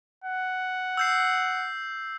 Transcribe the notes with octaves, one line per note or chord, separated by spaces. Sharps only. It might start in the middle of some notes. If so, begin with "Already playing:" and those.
F#5
E6 G6 C7